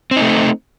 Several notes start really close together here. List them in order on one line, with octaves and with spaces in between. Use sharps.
C4 D#4 A3